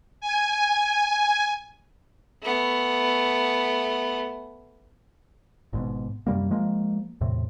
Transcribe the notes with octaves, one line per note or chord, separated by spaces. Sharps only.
G#5
A3 B3
G#1 G#2 B2
F#2 C3 G3 A#3
F3 G#3 A#3
E2 A2 C3